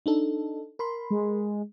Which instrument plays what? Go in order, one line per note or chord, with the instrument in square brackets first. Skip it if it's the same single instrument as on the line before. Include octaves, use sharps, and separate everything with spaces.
[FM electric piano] D4 D#4 A4
A#4 B5 C6
[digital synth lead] G#3